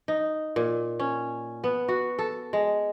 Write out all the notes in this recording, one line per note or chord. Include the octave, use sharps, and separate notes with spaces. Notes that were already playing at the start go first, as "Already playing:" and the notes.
D#4
A#2
C#4
B3
F#4
A4
G#3